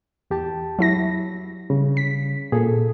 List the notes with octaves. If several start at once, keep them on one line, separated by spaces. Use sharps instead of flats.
E2 G4 A5
F#3 E4 A#6
C#3 G3
B6
A#2 G#4 A4